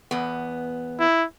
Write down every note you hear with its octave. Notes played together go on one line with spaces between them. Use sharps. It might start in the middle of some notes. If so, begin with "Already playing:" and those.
E2 B3
E4